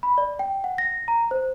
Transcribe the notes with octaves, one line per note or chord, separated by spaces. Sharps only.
B5
D5
G5
F#5
A#6
A#5
C5